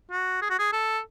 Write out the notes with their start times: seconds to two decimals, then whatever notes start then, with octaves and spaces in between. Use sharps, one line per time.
0.11 F#4
0.42 G#4
0.50 F#4
0.59 G#4
0.73 A4